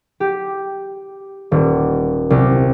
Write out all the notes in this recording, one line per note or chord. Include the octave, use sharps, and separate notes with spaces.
G4
D#1
C2